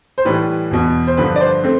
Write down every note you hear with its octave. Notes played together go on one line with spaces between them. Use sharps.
C5
A2 E3 G3 B4
E2 B2 B3
C5
G2 D3 F3 B4
D5
C5
A3 C4